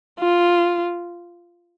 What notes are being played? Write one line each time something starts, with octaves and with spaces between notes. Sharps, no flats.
F4